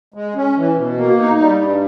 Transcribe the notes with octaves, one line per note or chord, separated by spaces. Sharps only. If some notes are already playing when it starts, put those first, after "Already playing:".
G#3
C#4
E3
B2
A#3
D#4
G3
G2